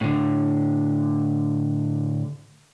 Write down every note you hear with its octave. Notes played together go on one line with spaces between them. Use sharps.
A2 D3